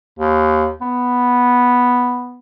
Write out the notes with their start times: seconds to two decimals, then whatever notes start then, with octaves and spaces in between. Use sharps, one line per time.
0.19 D#2
0.81 B3